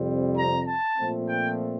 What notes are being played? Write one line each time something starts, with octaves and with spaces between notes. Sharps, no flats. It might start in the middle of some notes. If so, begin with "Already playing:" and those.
Already playing: F2 C3 G3 C4
A#5
A5
A#2 F3 A3 C4
G5